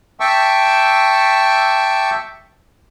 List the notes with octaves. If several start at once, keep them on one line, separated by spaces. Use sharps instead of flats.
E5 G5 A5 C#6 D6 E6